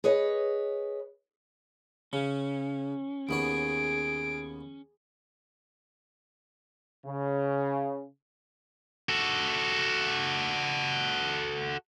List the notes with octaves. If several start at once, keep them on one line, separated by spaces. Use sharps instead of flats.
G#4 B4 C#5 D#5
C#3 C#4
D#2 B3 G#4 C#5 D7
C#3
F#4 A4